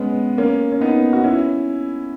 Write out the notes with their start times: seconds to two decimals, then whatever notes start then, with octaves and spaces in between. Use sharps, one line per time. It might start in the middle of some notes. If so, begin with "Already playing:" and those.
Already playing: G#3 B3 C#4
0.38 A#3 C#4
0.72 C#4
0.81 B3 D#4
1.13 F#4
1.24 C#4 E4